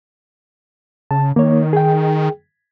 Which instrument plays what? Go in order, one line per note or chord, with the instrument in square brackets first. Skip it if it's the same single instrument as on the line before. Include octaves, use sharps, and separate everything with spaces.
[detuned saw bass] C#3 [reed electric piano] A5
[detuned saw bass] D#3 [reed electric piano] A#3 C#5
[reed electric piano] G#4 G5